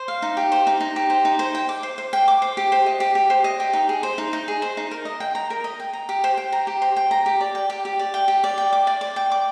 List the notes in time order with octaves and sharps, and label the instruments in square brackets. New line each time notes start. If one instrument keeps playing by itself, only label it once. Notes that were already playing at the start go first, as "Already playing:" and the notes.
Already playing: [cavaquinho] C5
F5
D#4
G4
C5
D#4
D#4
G4
C5
D#4
C5
G5
D6
C5
C5
G5
D6
C5
G4
C5
D#5
G4
G4
C5
D#5
G4
D#4
G#4
C5
D#4
D#4
G#4
C5
D#4
A#4
D#5
G5
A#5
A#4
D#5
G5
A#5
G4
C5
G5
A#5
G4
C5
G5
A#5
G4
D5
G5
G4
G4
D5
G5
G4
D5
G5
D6
D5
D5
G5
D6